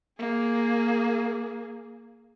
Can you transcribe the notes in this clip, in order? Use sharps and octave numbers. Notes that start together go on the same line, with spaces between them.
A#3 G#4